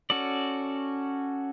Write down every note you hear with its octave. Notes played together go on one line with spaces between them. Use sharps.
C#4 F#4 A4 D5